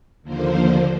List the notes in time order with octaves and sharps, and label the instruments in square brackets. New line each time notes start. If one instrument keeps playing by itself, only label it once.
[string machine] D#2 D3 F3 A#3 C5